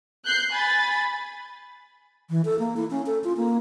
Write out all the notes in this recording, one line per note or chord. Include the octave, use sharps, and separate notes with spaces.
F#6 G6 C7
G#5 B5 A6
E3
A4
A#3
E4
C#4
A4
F4
A#3